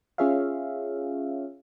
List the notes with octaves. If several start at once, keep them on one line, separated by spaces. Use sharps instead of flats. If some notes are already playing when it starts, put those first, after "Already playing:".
C#4 F4 G#4 C#5 E5 F5